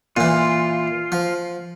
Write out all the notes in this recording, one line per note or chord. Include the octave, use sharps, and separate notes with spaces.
A#2 E3 F4
F3